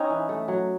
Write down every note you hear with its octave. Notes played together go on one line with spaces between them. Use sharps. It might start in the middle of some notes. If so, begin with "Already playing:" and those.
Already playing: C4 C#4 D#4
E3
A3
F#3